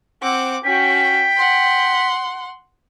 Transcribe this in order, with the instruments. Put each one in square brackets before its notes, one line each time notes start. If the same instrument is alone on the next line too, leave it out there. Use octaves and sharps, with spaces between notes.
[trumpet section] C4 [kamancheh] F#5 D6
[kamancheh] C#4 F#4 [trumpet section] G5 [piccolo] B6
[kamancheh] F#5 C6